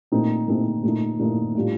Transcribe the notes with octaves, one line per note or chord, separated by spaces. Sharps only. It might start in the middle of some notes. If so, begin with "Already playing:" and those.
A#2 A3 C4 D#4
A#2 A3 C4 D#4
A#2 A3 D#4
A#2 A3 D#4
A2 G3 D4 F4